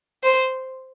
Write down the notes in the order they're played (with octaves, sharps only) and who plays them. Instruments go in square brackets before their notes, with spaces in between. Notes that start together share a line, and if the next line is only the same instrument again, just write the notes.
[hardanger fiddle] C5